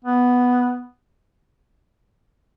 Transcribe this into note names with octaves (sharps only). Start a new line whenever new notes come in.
B3